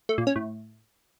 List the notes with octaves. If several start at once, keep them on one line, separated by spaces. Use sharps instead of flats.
A3
A#2
C#4
A2